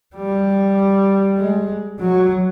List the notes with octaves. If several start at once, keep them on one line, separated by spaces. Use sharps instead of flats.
G3
G#3
F#3